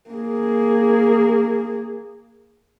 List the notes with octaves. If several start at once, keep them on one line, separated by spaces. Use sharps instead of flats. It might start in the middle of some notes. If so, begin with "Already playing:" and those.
A#3 G#4